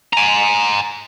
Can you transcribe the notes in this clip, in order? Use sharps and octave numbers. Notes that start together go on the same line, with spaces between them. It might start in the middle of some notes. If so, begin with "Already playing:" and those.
G#5 A#5